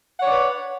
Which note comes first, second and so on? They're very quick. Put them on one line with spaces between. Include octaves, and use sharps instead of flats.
F#5 C#5 D5 B4